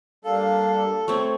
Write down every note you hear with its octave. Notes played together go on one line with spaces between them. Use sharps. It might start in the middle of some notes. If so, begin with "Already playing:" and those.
G3 A#3 D4 A4 F5
A3 C4 C#5 C#6